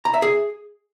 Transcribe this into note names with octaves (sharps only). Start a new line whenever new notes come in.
A#5
E5
G#4